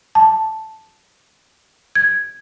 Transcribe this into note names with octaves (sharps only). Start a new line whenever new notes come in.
A5
G#6